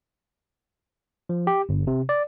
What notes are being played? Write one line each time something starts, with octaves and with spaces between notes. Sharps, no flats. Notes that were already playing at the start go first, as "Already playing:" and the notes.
F3
G4
G1
C3
D5